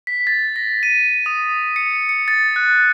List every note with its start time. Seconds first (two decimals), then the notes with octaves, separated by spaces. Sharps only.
0.07 B6
0.27 A6
0.56 A#6
0.83 D#7
1.26 D#6
1.76 C#7
2.09 C#7
2.28 A6
2.56 F#6